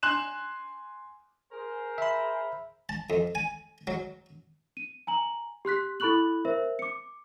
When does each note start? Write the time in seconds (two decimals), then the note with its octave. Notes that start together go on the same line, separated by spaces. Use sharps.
0.03 G#5 C6 F#6 E7
1.52 G#4 A#4 C5
1.98 E5 B5
2.89 A5
3.10 F2
3.35 G#5
3.87 F#3
4.77 D#7
5.07 G#5 A#5 F#7
5.65 G4 C6 F#6 B6
6.00 E4 A4 B5 C#6 F#6 F#7
6.45 A#4 C5 E5
6.79 D6 C#7